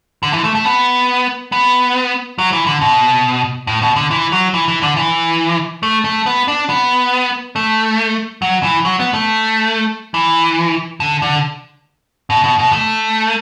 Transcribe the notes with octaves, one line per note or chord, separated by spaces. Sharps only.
D3
E3
A3
A3
B3
B3
F#3
E3
D3
B2
A2
B2
D3
E3
F#3
E3
E3
D3
E3
A3
A3
B3
D4
B3
A3
F#3
E3
F#3
B3
A3
E3
D3
D3
B2
B2
B2
A3